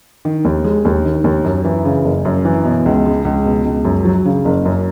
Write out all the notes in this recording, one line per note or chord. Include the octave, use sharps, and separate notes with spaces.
D#3
D#2
G#3
D#2
D#3
D#2
F#2
E3
C#3
F#1
F#2
E3
B2
C#2
G#3
C#2
B2
C#2
F#2
F#3
C#3
F#1
F#2